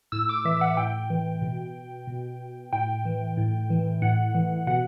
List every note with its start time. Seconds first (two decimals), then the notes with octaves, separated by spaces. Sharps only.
0.12 A2 E6
0.29 D6
0.45 E3 E5
0.61 F#5
0.77 A2 G5
1.10 E3
1.42 B2
2.07 B2
2.73 A2 G5
3.05 E3
3.37 A2
3.70 E3
4.02 A2 F#5
4.35 E3
4.67 B2 F#5